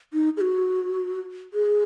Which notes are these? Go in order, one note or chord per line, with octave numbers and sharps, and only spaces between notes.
D#4
G#4
F#4
G#4